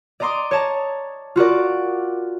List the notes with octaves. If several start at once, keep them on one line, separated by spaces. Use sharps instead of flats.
D5 D#5 A#5 C6 D6 D#6
C#5 A5 A#5
F4 F#4 A#4 D5